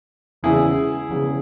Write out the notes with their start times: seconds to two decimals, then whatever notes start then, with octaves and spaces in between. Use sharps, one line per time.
0.43 E1 E2 C#3 E3 E4 G#4
1.09 E1 E2 C#3 E3